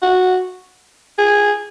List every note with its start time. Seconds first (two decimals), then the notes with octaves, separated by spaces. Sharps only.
0.02 F#4
1.18 G#4